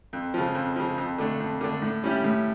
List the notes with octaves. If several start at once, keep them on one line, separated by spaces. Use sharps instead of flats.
F2
C#3 F3
F2
C#3 F3
F2
D3 A3 D4
F2
D3 A3 D4
A2
G3 C#4 E4 G4
A2